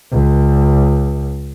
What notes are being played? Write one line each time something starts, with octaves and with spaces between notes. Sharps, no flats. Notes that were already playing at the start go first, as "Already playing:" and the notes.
C#2